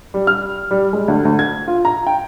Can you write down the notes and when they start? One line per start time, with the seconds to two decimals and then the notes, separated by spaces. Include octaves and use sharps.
0.14 G3
0.27 F6
0.71 G3
0.93 G#3
1.08 D2
1.25 D2
1.39 G#6
1.68 F4
1.85 A#5
2.07 G5